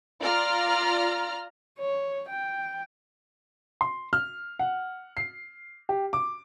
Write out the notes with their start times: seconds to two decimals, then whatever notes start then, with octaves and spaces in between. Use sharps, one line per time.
0.20 F4 D5 A#5 F6
1.79 C#5
2.28 G5
3.81 C6
4.13 F6
4.59 F#5
5.17 C7
5.89 G4
6.13 D6